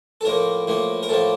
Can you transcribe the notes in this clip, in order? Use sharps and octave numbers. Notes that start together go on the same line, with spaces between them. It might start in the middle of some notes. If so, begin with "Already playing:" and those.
A4
A2 F3 A#3 A#4
A2 F3 A#3
A#4
A2 F3 A#3 A4